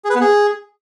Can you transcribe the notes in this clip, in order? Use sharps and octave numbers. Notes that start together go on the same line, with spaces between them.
G#4
B4
B3
G#4